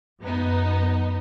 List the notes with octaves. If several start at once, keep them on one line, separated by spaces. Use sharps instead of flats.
F#2 B3 D#4